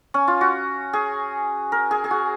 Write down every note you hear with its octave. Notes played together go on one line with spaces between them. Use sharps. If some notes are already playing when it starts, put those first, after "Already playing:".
C#4
F4
F#4
G#4
A#4
G#4
G#4
F#4